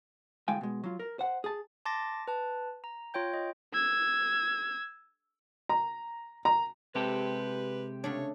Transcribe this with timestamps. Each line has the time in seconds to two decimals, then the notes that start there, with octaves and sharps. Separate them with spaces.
0.48 D2 A2 G#3 F5 G5 G#5
0.61 B2 G#3
0.84 F#3 F4
0.99 A#4
1.19 C5 F#5
1.44 G#4 A5
1.85 A5 C6 D6 A6 A#6
2.28 B4 A5
2.84 A#5
3.14 F4 C#5 G5 G6
3.34 D#5
3.74 E6 G#6
5.69 A#5
6.45 A#5
6.95 C3 G#3 G4 A4 B4
8.04 C#3 A3 D4 C#5